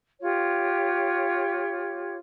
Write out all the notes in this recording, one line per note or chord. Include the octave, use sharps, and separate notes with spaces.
F4 G4 C#5